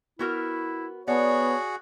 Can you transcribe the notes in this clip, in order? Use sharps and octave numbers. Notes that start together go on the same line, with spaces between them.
B3 E4 F#4 A#4
B3 F#4 G#4 C#5 D5 F#5 A5